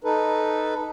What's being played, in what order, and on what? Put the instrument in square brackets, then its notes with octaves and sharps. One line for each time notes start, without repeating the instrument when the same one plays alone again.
[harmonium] D#4 A4 B4